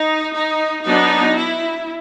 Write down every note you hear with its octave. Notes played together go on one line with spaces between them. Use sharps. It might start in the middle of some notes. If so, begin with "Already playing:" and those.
Already playing: D#4
D#4
F#3 B3 D4 D#4
E4